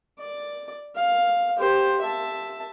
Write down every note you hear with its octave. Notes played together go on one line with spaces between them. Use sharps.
D5
F5
G4 C5
E5 A5